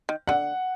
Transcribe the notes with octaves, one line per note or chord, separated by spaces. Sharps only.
D#3
D3 F#5